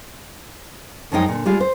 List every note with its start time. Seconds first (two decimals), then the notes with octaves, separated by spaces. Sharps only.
1.12 F#2 F3 G#3 D#4 D#5 G5
1.28 A#2 D3
1.46 G3 G#3 F4
1.60 C5